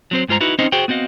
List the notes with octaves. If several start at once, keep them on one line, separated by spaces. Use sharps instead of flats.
F#3 C4 C5
G2 G#3 F4 C5 A#5
D#4 E4 F#4 B4
C4 C#4 D#4 C5 D#5
F#4 G#4 C5 G5
B3 C4 F#4 D#5 F5